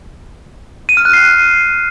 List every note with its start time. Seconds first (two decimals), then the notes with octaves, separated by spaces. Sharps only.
0.89 D#7
0.97 F6
1.05 F#6
1.13 C7